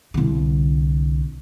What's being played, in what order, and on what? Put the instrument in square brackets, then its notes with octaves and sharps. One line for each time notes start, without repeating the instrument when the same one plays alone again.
[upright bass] C2 D3